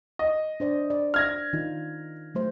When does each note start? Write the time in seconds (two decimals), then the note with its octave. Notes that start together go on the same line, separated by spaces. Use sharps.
0.19 D#5
0.60 D4 C5 D5
0.90 D5
1.14 F6 G#6 A#6
1.53 D#3 D#4 F4
2.35 F#3 A3 C5